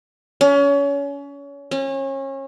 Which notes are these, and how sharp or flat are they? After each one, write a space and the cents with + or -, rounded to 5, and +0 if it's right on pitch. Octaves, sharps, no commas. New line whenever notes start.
C#4 +30
C#4 -30